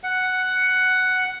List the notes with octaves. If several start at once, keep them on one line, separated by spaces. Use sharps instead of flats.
F#5